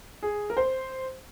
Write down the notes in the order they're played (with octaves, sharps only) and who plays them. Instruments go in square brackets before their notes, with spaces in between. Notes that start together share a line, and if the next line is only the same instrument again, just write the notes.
[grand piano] G#4
A#4
C5